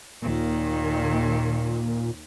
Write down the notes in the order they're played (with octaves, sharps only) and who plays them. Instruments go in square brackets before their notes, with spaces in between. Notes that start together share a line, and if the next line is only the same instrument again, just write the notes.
[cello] D#2 D#3 [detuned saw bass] A#2